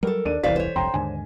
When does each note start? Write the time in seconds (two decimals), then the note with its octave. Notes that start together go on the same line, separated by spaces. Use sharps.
0.03 F#3 G3 A4 A#4
0.25 D#2 D4 D#7
0.44 E1 C2 E3 C5 D5 F5 B6
0.56 C5 C#5
0.76 G1 C2 F2 G5 A#5 C6
0.94 D#2 G#2 D3 G#5